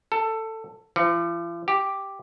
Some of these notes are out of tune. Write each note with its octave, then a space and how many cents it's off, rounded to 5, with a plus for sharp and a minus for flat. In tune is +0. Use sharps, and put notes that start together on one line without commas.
A4 +15
F3 -45
G4 +0